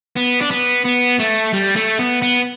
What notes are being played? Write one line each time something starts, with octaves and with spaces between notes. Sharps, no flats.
B3
D4
B3
B3
A3
G3
A3
B3
B3